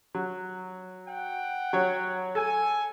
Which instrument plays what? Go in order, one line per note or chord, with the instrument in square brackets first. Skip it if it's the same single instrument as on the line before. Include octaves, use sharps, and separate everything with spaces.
[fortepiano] F#3
[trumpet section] F#5 G5
[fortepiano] F#3 C#5
[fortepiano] A4 [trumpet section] G#5